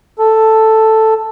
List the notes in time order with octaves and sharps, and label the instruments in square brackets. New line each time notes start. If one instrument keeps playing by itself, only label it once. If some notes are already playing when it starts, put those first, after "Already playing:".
[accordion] A4